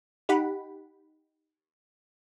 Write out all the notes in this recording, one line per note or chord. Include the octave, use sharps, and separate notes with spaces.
D#4 G4 F#5 B5